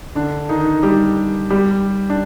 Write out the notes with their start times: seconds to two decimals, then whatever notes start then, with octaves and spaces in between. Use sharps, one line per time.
0.15 D3 D4
0.49 D#3 D#4
0.83 G3 G4
1.50 G3 G4
2.10 D4